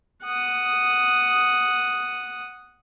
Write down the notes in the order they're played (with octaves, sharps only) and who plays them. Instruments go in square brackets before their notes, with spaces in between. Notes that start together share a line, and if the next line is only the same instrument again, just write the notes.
[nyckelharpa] F#5 D#6